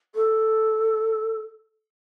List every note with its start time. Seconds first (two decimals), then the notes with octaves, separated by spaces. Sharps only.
0.15 A4